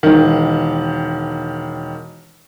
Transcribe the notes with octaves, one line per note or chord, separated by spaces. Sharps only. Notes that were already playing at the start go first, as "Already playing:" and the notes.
E1 D#3